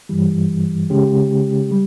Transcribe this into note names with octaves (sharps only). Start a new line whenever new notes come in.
G2 E3 G3
C#3 G#3 C#4 G4
G3